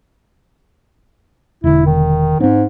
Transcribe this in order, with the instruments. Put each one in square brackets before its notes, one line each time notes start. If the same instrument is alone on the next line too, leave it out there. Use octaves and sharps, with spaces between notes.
[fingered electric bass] E1 D3 [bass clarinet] E4
[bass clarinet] D#3
[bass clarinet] G#2 [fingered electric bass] C4 C#4